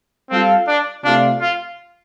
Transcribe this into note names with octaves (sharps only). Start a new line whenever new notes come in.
G3 C4 F4 A4 F5
D4
C3 A3 D4 F4 D5 F5
F4